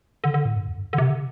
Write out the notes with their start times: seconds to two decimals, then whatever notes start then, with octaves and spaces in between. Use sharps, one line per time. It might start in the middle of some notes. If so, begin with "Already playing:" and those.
0.24 D3
0.34 D3
0.45 A2
0.56 G2
0.67 E2
0.77 G2
0.93 D3
0.98 C3
1.10 D3